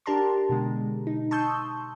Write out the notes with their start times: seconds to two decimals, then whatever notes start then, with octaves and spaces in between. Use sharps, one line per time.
0.06 D4 G4 A#4 A5 A#5 C6
0.49 B2 D3 G#3
1.07 D#4
1.31 A5 C6 C#6 D#6 E6 G6